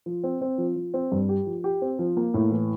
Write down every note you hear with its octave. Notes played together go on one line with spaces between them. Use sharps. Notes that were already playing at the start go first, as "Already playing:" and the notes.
F3
C4
C4
F3
F3
C4
G2
G4
F3
G4
C4
F3
A#3
A2
E3